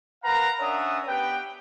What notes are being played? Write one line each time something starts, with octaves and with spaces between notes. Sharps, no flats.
A#4 B4 F5 F#5 A#5
C#4 D4 C#5 E5 F#5 D#6
B3 G4 B4 G5